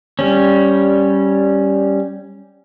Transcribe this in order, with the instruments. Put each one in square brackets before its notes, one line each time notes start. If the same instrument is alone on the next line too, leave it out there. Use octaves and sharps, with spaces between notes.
[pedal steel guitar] G3 C#4